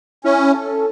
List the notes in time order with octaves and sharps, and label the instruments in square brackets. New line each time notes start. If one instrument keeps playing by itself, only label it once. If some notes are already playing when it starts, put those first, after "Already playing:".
[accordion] C#4 [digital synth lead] E4
[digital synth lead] A4